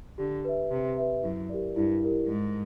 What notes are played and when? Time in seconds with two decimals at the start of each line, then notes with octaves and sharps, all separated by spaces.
0.18 D3 G4
0.45 B4 E5
0.71 C3 G4
0.97 B4 E5
1.23 F#2 E4
1.49 G4 A#4 D5
1.76 G2 E4
2.03 G4 A#4 D5
2.28 G#2 A#4